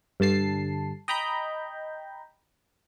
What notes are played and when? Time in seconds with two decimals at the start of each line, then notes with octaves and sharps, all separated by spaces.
0.20 G2 D3 A5 C7
1.08 D#5 G5 A#5 B5 G6